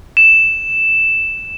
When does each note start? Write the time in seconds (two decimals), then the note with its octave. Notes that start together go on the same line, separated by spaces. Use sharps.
0.17 E7